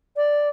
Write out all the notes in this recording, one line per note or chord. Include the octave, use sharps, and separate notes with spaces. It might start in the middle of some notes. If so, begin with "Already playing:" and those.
D5